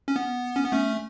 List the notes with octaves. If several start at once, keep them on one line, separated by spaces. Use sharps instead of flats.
C#4
B3
C#4
B3
A3 C#4